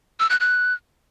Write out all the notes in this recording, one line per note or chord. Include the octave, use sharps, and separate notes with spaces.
E6
F#6
F#6